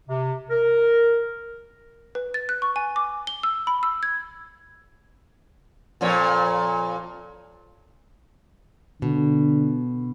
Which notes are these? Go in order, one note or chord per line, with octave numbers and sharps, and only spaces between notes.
C3
A#4
B4
A6
F#6
C#6
G#5
D6
G7
E6
B5
E6
G#6
F2 A#2 C#5
B2 D3